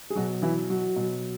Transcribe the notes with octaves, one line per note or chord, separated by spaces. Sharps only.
G#4
B2 F#3 F#4
E3 E4
F#3 F#4
B2 F#3